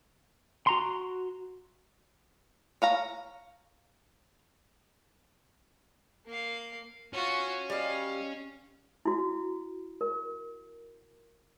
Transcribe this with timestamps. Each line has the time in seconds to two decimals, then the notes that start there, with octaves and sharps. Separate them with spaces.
0.67 F#4 A#5 C6
2.82 C#5 F5 A#5
6.26 A#3 F5
7.13 C#4 F4 F#4
7.70 G3 D#5 F5
9.05 E4 F#4
10.01 A#4